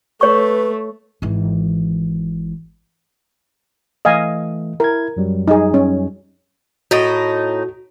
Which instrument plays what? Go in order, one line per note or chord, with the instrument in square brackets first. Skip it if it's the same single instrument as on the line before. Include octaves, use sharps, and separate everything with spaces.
[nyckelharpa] A3 [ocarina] B4 [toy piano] C#5 C#6
[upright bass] G#1 E3
[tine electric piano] E3 A3 [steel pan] D#5 F5 G#5
[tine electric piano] E4 G#6 [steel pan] A#4
[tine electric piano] F#2 F#3 G3
[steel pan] D#4 G#4
C#4
[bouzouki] A2 D#4 [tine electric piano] F#4